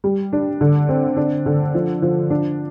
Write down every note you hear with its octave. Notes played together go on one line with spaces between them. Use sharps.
G3
D4
D3
C4
D4
D3
F3
F3
D4